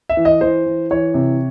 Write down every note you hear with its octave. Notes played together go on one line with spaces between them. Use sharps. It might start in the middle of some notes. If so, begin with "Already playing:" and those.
E5
E3
D#5
E3 C5
E3
E3 C#5
C3